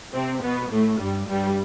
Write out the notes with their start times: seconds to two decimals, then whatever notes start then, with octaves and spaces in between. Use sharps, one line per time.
0.14 C3 C4
0.42 B2 B3
0.70 A2 A3
0.99 G2 G3
1.27 G2 G3